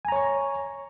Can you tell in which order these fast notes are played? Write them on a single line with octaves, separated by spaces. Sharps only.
G#5 A#5 C#5 C#6